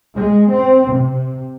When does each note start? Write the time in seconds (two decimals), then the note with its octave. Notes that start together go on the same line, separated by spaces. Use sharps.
0.16 G#3
0.51 C4
0.93 C3